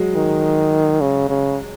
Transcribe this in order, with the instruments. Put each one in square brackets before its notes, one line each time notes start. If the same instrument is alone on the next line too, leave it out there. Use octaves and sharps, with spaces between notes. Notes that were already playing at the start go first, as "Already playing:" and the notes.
Already playing: [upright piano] F#3 G#3
[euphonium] D#3
C#3
C#3